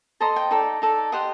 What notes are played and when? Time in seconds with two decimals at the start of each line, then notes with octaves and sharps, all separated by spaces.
0.20 A4 C5 D#5 A#5
0.36 G5
0.51 D#4 A4 D5
0.82 D#4 A4 D5
1.12 G4 C5 D#5 F#5